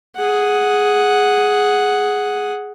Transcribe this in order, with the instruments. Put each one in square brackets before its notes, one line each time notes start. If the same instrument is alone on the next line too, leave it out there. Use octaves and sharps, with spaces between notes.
[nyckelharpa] G#4 F#5